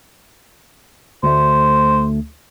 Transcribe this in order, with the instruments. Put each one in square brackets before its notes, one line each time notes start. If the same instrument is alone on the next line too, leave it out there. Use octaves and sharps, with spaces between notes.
[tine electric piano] D2 A3 [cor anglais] C5